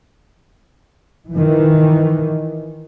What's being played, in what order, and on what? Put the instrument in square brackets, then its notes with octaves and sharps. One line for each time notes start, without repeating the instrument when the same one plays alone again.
[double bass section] D#3 E3